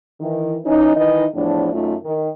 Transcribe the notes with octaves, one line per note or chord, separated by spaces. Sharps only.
D#3 E3
E3 C#4 D#4
D#3 E3 D#4 D#5
E2 A2 F3 D4
F#2 A3 D#4 F4
D#3